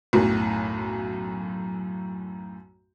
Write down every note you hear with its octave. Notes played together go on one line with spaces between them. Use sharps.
B1 F#2 A2